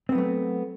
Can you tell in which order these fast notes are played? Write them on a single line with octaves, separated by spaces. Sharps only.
C4 B3 F#3 A3